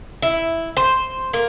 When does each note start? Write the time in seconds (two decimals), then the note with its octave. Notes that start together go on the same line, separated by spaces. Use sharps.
0.22 E4
0.77 C5
1.33 A#3